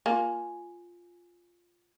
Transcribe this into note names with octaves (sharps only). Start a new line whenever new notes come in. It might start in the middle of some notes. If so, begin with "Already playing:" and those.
A#3 F4 G#5